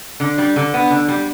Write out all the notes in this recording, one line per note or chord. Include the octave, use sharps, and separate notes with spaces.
D3
G3
D3
B3
D3
G3